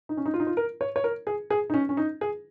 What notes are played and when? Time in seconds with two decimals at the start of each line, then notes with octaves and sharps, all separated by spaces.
0.09 D#4
0.17 C#4
0.26 D#4
0.34 F4
0.40 D#4
0.47 F4
0.57 A#4
0.81 C#5
0.96 C#5
1.04 A#4
1.27 G#4
1.50 G#4
1.70 D#4
1.74 C#4
1.89 C#4
1.97 D#4
2.21 G#4